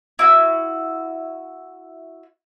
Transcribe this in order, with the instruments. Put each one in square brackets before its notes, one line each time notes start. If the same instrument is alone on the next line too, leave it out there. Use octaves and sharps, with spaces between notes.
[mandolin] E4 F#4